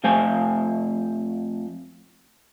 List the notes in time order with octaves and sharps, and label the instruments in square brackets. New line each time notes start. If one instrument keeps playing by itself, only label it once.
[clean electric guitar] F2 A3 C5 F5 G#5